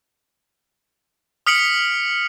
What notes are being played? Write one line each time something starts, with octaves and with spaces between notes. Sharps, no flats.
D#6 F6 B6 C#7 D7 F#7